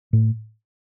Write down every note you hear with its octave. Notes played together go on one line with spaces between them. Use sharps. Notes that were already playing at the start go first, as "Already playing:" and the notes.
A2